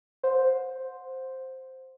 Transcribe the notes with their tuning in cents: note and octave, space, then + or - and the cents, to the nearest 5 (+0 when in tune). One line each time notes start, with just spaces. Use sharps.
C5 +0 F#5 -30